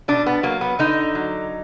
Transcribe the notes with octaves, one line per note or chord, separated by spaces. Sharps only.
B2 D4
B3
F#3 A#3
B3
D3 D#4
F#3